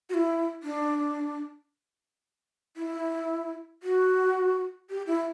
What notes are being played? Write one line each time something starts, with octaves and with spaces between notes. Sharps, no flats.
F#4
E4
D4
E4
F#4
G4
E4